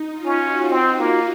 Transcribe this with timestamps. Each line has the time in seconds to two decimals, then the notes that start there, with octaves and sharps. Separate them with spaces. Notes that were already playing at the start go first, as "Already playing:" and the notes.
Already playing: D#4
0.11 F4
0.26 C#4
0.41 F#4
0.69 C4 F#4
0.99 A#3